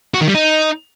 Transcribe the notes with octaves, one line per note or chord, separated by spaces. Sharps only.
F#4
D#3
G3
D#4